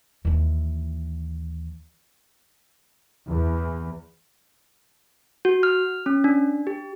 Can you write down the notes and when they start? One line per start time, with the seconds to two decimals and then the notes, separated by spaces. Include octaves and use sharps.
0.25 D#2 E3
3.28 E2
5.45 F#4
5.63 F6
6.06 C#4
6.24 D4
6.67 G4